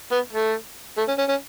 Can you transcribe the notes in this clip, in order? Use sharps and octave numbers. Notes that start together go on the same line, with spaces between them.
B3
A3
A3
C#4
C#4
C#4